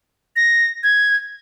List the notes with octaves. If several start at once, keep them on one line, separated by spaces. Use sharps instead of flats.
A#6
G#6